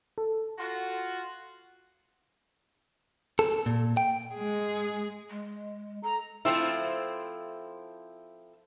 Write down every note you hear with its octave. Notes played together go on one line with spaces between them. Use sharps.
A4
F4 F#4
A4
A#2
G5
G#3 G#4
G#3
A4 A#5
F3 A3 C4 E4